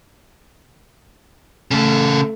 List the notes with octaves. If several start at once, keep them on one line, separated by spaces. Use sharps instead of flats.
C#3 A3 A4